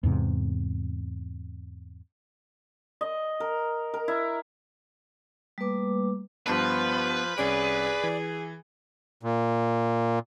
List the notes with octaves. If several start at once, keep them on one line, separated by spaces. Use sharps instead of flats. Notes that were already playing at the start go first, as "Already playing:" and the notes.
E2 G#2 C3
D#5
A#4
A#4
E4
G3 A3 A#3 B4 D6
G2 F3 B3 B4 A5 B5
C2 C#4 G#4 D5 D7
E3
A#2